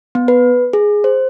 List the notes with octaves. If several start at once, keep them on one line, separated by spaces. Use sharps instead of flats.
B3
B4
G#4
C5